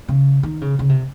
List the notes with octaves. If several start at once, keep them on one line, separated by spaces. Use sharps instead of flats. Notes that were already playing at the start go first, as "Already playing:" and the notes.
C#3
D#3
C#3
C#3
C3